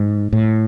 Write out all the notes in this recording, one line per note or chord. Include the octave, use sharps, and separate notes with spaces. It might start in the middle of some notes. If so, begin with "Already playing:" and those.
Already playing: G#2
A2